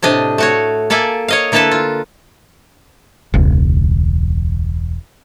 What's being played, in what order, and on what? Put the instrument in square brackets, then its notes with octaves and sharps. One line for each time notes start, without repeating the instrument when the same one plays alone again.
[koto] A2 C3 D4 D#5
A3 F#4 C#5
A#3 A4 D5 E5 G#5
C#5 D#5 F5
D3 A#3 E4 A4 B4 A5
F4
[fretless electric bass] E1 C#2